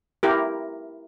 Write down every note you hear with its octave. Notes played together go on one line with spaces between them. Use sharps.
E4 G4 A#4